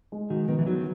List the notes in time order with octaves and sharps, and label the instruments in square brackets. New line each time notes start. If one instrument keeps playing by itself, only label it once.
[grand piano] G#3
[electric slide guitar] D#3 [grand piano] F#4
[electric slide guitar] D#3 [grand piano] B3
[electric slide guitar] E3
[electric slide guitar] D#3 F#3 [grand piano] F#4